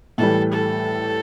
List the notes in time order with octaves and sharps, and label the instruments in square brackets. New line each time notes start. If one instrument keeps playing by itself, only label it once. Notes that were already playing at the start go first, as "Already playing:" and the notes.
[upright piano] A2 E3 G3 [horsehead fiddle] A4
[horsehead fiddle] A4